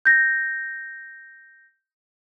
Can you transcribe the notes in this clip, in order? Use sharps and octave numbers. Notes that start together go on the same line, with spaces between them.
G6 A#6